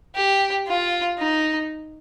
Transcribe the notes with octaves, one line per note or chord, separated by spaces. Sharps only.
G4
F4
D#4